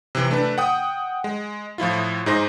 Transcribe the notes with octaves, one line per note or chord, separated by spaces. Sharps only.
C3 E3
A3 D4 B4
F#5 G5 D#6
G#3
A2 F3 E4 F4
G#2 D#4 G#4 C5 A#6